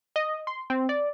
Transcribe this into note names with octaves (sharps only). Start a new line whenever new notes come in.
D#5
C6
C4
D5